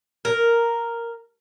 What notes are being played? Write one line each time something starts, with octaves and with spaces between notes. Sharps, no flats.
A#4